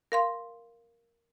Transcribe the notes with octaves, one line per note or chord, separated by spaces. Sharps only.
A#4 F5 C6